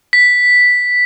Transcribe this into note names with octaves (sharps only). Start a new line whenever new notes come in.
B6